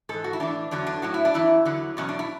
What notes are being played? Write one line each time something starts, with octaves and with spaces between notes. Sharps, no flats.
G#2 E3 A4
F#4
E4
A2 E3 D4
E2 D3 F#3 D4
D4
A2 F#3 F#4
E4
D4
F#2 E3 E4
E2 D3 F#3
E2 B2 F#3 C#4
D4
E4